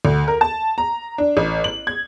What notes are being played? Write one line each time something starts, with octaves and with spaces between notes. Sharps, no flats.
D2
A#4
A5
A#5
D4
A1
F#7
G#6